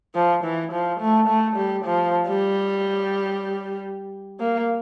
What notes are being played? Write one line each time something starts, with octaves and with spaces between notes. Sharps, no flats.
F3
E3
F3
A3
A3
G3
F3
G3
A#3